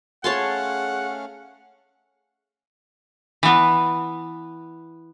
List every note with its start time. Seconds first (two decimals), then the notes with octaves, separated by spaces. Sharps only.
0.24 A3 C#4 G#4 C#5 F5 F#5 A5 C6
3.43 E3 B3